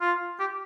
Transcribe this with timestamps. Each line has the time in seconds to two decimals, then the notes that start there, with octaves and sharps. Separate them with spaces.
0.01 F4
0.40 G4